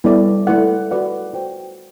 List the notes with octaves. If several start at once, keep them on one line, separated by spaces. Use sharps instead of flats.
G3 B3 E4 A4 D5
A3 E4 B4 D5 F#5
F#4 B4 D5 F#5
F#4 C5 G5